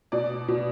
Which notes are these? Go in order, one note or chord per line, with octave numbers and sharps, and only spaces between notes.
B2 D5
B2